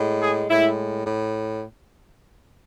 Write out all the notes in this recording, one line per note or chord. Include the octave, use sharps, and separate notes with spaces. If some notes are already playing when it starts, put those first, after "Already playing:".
Already playing: A2 G#3
G#4
A2 G#3 E4
A2